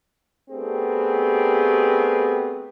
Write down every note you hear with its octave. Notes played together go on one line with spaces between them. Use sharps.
A3 B3 C4 D4 G4 G#4